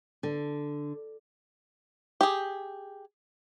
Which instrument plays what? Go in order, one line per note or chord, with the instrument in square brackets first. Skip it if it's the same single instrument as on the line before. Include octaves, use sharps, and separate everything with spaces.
[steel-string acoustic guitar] D3
[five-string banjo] G4 G#4